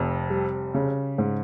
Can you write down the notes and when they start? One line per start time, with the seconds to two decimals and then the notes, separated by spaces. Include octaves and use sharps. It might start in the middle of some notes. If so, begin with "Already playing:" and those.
Already playing: F1 F2
0.30 G3
0.74 C#3
1.18 G#2